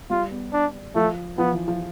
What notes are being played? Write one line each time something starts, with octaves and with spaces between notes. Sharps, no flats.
G3 F4
B3
D4
F3 A3
F3 B3
E3
F3